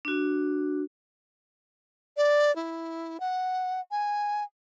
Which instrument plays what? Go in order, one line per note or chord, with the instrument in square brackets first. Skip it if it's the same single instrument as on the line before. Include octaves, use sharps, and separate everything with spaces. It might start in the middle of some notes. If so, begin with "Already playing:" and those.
[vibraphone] D4 F#4
[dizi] D5
E4
F#5
G#5